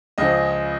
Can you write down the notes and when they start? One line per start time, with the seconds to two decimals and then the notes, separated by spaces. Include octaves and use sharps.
0.18 C#2 C#3 F3 D#5